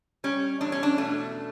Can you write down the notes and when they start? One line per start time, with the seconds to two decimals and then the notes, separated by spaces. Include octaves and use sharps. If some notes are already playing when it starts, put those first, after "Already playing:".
0.24 G3 C#4
0.61 E2 D4
0.72 C#4
0.83 D4
0.98 B2 A3